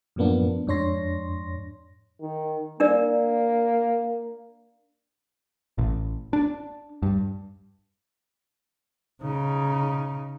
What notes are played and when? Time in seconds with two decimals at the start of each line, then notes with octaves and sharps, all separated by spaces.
0.16 F#2 A2 F3 A#3 B3 D4
0.67 F2 G#2 D4 C#5 C6 A#6
2.21 D#3
2.80 A#3 D4 A#4 D5
5.78 A1
6.33 D4
7.02 G2
9.21 C#3 D#4